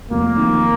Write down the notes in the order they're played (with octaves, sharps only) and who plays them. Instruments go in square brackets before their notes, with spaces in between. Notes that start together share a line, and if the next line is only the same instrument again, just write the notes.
[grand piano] F1 [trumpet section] A#3
[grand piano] F2 D#3